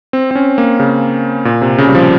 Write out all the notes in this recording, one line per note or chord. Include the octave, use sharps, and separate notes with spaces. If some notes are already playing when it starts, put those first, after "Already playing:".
C4
C4
C#4
A#3
C#3
A#2
C3
C#3
G3
F3